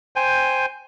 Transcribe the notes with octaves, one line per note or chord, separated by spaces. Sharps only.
C5 G5 G#5